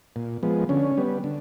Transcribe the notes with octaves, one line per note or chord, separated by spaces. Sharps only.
A#2
F3 G#3 B3
D3 C#4
G3 B3
D3